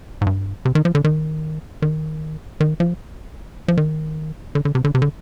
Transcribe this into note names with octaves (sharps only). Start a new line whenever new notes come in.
G#2
G2
C3
D#3
F3
D3
D#3
D#3
D#3
F3
F3
D#3
D3
D3
C3
D3
C3
D3